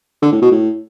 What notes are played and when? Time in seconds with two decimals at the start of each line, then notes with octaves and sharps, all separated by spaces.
0.22 D3
0.32 A2
0.42 B2
0.51 A2